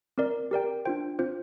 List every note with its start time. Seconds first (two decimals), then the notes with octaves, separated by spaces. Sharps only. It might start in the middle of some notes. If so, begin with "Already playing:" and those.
0.18 C4 A#4 D5
0.51 G4 A#4 D5 G5
0.85 D4 F4 C5 G5
1.19 C4 F4 C5